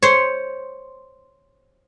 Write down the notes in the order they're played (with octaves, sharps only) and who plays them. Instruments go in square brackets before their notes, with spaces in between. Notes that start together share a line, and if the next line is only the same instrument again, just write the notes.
[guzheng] C5 C#5